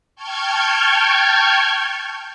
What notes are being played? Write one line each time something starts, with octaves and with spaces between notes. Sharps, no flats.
G5 A5 C#6 F6 G6 G#6